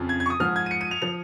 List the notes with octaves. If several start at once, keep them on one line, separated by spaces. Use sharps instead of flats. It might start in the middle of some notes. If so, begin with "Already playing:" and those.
Already playing: F2 C#3 F3
G#6
G#6
C#6
D#6
G#2 F3 F6
G#6
D#7
C#7
D#7
F7
F3 F7